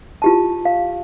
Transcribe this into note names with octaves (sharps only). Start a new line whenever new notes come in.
F4 G4 A5
F5